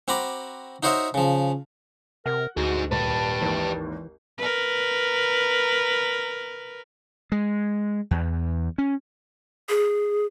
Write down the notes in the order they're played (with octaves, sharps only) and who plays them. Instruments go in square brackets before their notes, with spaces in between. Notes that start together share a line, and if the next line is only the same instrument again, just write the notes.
[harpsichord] C4 F#4 A#5 B5 D6
D#4 F#4 C5 C#5 D#5 E5
C#3 F3
[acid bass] C3 [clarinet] A#4 [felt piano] F#5
[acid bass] D2 [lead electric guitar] D#4 G#4 [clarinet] F#4
[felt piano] D#1 [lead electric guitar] G4 B4 [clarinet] A5
[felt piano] G#1 D#2 [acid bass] E3
[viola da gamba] A#4 B4
[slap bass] G#3
E2
C#4
[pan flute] G#4